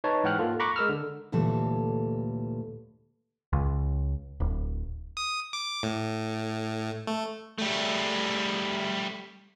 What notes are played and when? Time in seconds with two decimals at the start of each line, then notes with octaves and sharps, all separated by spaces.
0.04 D#4 B4 C#5 A5
0.24 G#2 E3 F#5 G5 F6 F#6
0.39 A#3 F4 A4
0.60 A#5 B5 C#6 D6 F#6
0.76 G#3 A#4 E6 F6
0.89 D3
1.32 D2 A#2 E3 G3 A4 C#5
3.53 C#2
4.40 D1
5.17 D#6
5.53 D6
5.83 A2
7.07 A3
7.58 G3 A3